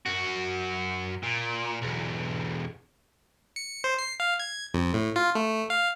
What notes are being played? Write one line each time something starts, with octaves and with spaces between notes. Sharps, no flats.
F#2 F#4
A#2
B1 E2
C#7
C5
C7
F5
G#6
F2
A2
F4
A3
F5